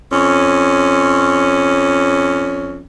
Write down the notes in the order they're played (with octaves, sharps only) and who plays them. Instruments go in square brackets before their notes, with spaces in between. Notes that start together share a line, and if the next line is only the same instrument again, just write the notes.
[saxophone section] F2 C#4